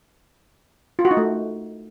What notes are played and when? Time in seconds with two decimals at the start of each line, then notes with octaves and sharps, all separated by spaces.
0.99 F4
1.05 F#4
1.11 D#4
1.17 A3